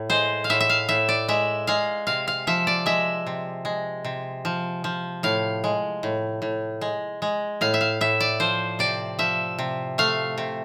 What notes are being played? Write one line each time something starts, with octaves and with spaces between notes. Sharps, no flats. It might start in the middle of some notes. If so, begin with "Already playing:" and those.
Already playing: A2
G#3 C5
F5
A2 E5
E5
F5
A2 E5
D5
G#3 E5
G#3 F5
C3 F5
F5
F3 E5
D5
G#3 E5
C3
G#3
C3
F3
F3
A2 F5
G#3
A2
A2
G#3
G#3
A2 F5
E5
F5
A2 E5
D5
F3 C5
C3 D5
F3 E5
C3
A3 F5
C3